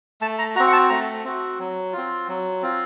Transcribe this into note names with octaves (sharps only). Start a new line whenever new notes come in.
A3 A5
A#5
C4 F#4 A#5
F#5
A5
A3 A#5
C4 F#4
F#3
C4 F4
F#3
C4 F4